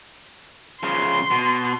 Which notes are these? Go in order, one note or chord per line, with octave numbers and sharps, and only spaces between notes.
C#3 F3 C6
B2